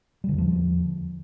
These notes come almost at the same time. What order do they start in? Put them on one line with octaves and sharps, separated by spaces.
G3 D3 E2 F3